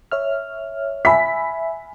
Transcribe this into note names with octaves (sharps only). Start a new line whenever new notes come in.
C#5 E5 F6
E5 G#5 B5 B6